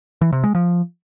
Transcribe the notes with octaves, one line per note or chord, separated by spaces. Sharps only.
E3
C3
G#3
F3